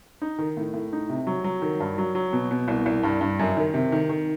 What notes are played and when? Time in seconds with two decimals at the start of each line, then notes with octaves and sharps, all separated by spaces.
0.22 D#4
0.38 D#3
0.57 A2
0.74 A2
0.93 D#4
1.09 C3
1.27 F#3
1.44 F#3
1.62 D#3
1.80 G2
1.98 F#3
2.15 F#3
2.33 B2
2.51 B2
2.68 C2
2.86 C2
3.03 G2
3.21 G2
3.40 F#2
3.57 D#3
3.74 C3
3.92 D#3
4.09 D#3